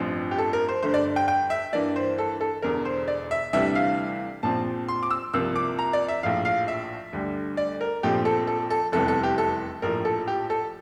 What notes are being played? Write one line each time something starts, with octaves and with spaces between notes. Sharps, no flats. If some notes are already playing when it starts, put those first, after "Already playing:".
Already playing: A1 G2 F3 C4
G4
A4
A#4
C5
G2 D3 A3 C5
D5
G5
G5
E5
G2 E3 A#3 D4 D5
C5
A4
A4
E1 E2 D3 A#4
C5
D5
E5
D2 C3 E3 G3 D4 E5
F5
A#1 A#2 F3 C4 A5
C6
D6
E6
C2 C3 F3 A#3 E6
D6
A#5
D5
E5
A#1 A2 F3 F5
F5
E5
D2 D3 G3
D5
A#4
A#1 A#2 F3 A3 C4 G4
A4
A4
A4
F1 E2 C3 E3 G3 A4
A4
G4
A4
A#1 A2 F3 A#4
A4
G4
A4